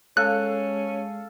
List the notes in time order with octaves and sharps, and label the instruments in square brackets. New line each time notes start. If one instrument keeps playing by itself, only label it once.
[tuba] G#3 [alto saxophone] C#4 [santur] A4 F5 [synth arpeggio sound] F#6